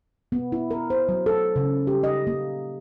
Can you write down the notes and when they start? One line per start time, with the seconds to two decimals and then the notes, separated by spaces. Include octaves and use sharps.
0.32 B3
0.52 E4
0.71 A#4
0.90 C5
1.09 F#3
1.26 A4
1.56 C#3
1.87 G4
2.04 D#5
2.27 A#3